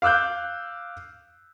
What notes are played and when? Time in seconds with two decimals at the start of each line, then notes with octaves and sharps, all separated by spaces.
0.02 F5 D6 E6 F#6 G6